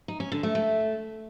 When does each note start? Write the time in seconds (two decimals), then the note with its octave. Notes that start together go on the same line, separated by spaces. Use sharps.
0.08 D#4
0.20 C#4
0.32 D3
0.43 A3
0.55 A3